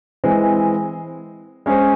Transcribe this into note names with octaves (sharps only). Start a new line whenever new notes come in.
E3 G#3 C4
G#3 C#4 G#4 C5